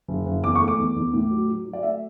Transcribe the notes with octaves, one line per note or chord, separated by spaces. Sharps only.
F#1
F#1
E2 D6
C#6
A3
D6
E2
E2
A2
F#3
F#3
F#3
D5
A3 E5